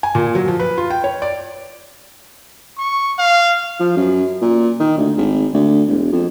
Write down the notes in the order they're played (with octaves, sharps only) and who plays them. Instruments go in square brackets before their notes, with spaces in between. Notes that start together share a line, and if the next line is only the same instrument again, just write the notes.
[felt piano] G#5
A#2
F#3
F3
B4
F4
G5
C#5
D5
[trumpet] C#6
F5
[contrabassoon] F3
F#2
A#2
D#3
D2
G#1
D2
E1
F2